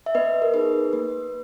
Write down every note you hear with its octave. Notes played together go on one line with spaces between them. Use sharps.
E5
B3 B4 D#5
A#4
D#4 G#4 B4
A#3 B4